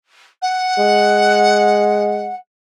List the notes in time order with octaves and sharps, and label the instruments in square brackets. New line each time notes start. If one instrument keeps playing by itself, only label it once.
[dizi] F#5
[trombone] G#3